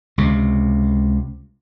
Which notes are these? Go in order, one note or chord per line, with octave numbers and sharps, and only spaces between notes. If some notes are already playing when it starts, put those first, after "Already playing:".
C#2 C3